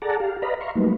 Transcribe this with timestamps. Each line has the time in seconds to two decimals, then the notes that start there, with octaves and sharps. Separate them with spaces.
0.02 G#4 A4 D5 F#5 A5 A#5
0.20 G4 F5
0.42 B4 D5 D#5 F5 A#5 B5
0.61 E5 F5 A#5 C6 C#6
0.75 F#3 G3 A3 A#3 D#4 B4